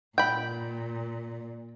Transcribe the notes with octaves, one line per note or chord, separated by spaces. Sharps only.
A#2 G5 B5